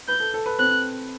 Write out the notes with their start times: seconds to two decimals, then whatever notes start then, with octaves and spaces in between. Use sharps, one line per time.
0.08 B4 G6
0.20 A4
0.34 A4
0.46 B4
0.58 C4 F#6